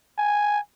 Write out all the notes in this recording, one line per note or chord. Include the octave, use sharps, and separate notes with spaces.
G#5